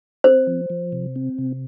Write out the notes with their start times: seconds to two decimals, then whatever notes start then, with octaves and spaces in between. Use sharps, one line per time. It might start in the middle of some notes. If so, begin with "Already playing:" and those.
0.24 C4 C5
0.47 F3
0.70 F3
0.92 C3
1.16 C4
1.38 C3